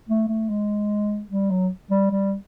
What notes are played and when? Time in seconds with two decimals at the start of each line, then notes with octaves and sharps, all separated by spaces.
0.09 A3
0.29 A3
0.50 G#3
1.30 G3
1.50 F#3
1.91 G3
2.11 G3